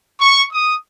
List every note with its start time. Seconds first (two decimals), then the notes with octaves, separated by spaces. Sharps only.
0.21 C#6
0.53 D#6